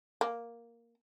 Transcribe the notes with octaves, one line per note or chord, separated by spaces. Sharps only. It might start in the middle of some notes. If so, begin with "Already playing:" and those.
A#3